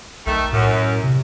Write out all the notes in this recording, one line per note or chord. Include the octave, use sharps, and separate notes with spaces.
B1 D#3 A3
F#2 A2
C3